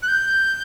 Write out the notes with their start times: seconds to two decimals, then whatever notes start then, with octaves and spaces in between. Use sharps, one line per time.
0.03 F#6
0.08 G6